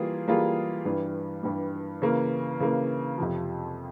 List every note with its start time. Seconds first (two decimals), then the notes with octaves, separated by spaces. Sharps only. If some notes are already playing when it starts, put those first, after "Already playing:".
Already playing: E3 G3 A#3 F4 G#4
0.27 E3 G3 A#3 F4 G#4
0.85 G2 E3 G3
1.43 G2 E3 G3
2.02 C#3 E3 A#3
2.60 C#3 E3 A#3
3.18 F2 C3 F3